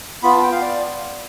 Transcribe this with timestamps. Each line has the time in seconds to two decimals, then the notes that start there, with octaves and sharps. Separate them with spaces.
0.23 B3 F4 B5
0.32 A5
0.43 G5
0.52 F5
0.62 D5